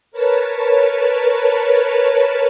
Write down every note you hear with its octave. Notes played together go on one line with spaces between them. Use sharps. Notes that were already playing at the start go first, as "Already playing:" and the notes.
A#4 B4 C#5 A5